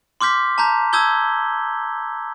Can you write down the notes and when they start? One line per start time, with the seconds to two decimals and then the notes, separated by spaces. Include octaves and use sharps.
0.21 C6 D6 F6 G6 B6
0.58 A5 A#5 G6
0.93 A5 D#6 E6 G6 G#6 G7